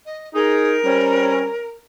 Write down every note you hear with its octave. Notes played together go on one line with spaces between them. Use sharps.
D#5
D#4 G#4 A#4
G3 C4 C#4